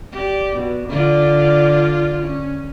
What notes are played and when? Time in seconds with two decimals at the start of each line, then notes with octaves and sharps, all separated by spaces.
0.12 G4 D5
0.57 B2
0.88 D3 F4 D5
2.22 C#4